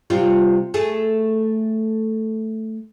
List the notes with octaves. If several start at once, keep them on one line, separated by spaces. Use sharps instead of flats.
C3 G3 F4
A3 G#4